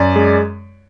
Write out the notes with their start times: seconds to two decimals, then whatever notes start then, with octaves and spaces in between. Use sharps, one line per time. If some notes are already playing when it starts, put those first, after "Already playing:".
Already playing: F#2 D5
0.16 G#3